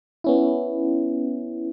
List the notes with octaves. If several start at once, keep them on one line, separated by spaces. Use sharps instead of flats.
B3 C#4 E4